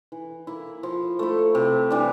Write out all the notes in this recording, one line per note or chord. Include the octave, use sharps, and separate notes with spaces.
E3
A#3 E4
F3
A3 E4
C3
E3 G3 D4